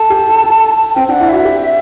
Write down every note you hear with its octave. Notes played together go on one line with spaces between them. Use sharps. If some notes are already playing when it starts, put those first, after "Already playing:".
Already playing: A4 A5
G4
A4
A4
C4 G5
D4 F#5 G5
E4
F#4 E5
G4